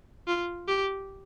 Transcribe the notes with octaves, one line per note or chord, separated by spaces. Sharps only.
F4
G4